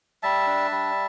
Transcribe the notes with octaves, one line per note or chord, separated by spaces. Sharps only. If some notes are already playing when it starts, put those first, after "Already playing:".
G3 E5 A5
D4
G3